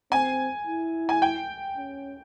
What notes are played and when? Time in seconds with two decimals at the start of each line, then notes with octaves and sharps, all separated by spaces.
0.12 C4 G#5
0.67 E4
1.09 G#5
1.22 G5
1.77 C#4